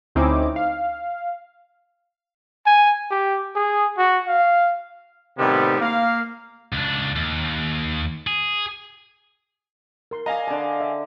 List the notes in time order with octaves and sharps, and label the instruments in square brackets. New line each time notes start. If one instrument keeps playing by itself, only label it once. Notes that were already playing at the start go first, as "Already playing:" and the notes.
[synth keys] D2 C4 C#4 D#4 E4 D6
F5
[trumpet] G#5
G4
G#4
F#4
F5
[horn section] A2 C3 D#3 G3 B3
A#3 F5
[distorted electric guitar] C#2 D4
D#2
G#4
[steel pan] A#4 C6
[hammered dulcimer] D5 B5 [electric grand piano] D#5 F5 G#5 [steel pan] A#5
[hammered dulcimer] D3 D5 [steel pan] A5
[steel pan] E5